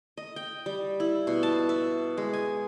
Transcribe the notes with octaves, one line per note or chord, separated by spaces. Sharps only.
D#5
G5
G3
E4
B2
A5
E5
G#3
G#5